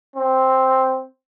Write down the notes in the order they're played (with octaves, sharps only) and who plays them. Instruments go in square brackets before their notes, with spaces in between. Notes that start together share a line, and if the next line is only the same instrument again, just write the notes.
[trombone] C4